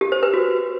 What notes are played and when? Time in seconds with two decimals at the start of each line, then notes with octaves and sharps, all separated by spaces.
0.01 G4
0.12 C5
0.23 B4
0.33 F#4